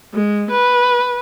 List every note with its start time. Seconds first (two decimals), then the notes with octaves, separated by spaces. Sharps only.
0.14 G#3
0.51 B4